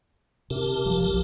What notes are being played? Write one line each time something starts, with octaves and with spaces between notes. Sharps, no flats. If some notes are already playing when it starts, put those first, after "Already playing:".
C3 G4 A#4 A5
F#1 F3 F#3
B1 F3